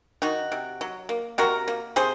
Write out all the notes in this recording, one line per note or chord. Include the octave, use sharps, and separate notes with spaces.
D#3 D#4 F#4
C3
F#3
A#3
C3 F#4 A#4
A#3
C3 G#4 C5